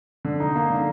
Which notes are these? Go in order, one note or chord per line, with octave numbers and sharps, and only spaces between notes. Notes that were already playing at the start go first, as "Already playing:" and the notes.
D3
D#4
A#3
D3